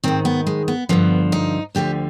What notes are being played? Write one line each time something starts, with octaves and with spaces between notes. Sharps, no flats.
G#2 D#3 C4
B3
G#3
B3
G2 D3 F3 B3
D#4
D2 D3 F3 G4